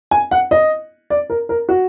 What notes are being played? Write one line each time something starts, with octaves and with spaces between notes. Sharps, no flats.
G#5
F#5
D#5
D5
A#4
A#4
F#4